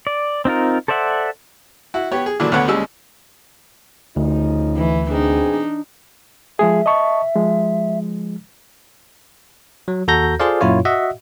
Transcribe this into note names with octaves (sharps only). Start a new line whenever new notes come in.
D5
C4 D#4 F4 A#4
A4 C5 D5 E5 F#5
E4 F#4
B3 G4 C#5
G#4
A#2 D3 E3 F#3 D4
D2 D3 B3 C#5 F#5 D6
D#2 G3 G#3 C#4 E6
D2 C#3 F3 D#4
E3
B2 C4 D4 D#4 G#4
F3 G#3 G#4 E5
D#5 A5 C#6
F3 G#3
F#3
D#2 F#4 A4 A#5 G6 A#6
F4 G#4 A4 C5 D5 F5
F#2 A#2 E4 F4 C#5
F#4 D#5 E5 F#5